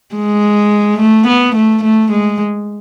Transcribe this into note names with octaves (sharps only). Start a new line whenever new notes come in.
G#3
A3
B3
A3
A3
G#3